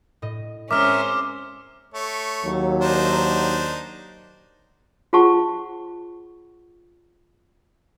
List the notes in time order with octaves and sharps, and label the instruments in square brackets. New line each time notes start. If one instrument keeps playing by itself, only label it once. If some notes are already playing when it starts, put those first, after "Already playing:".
[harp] A2 D#5
[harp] G#3 C4 [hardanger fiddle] C#4 C5 [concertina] A#4 E5 [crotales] D6 F6
[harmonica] A3 C#5
[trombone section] D#2 F#3
[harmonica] D4 D#4 C5
[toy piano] F4 G#4 C5 F#5 A5 C#6